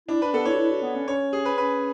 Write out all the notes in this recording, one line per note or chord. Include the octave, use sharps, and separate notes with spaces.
D4 E4
D4 B4
B3 A4
E4 C#5
F#4
E4
F#4
B3
C#4
C#4 C#5
G#4
B4
C#4 B4